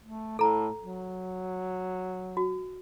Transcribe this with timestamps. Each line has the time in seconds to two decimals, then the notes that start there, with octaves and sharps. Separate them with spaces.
0.02 A3
0.39 A2 A4 A#5
0.82 F#3
2.37 F#4